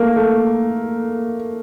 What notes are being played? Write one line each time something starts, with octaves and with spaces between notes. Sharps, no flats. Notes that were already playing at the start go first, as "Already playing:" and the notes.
Already playing: A3 A#3
A3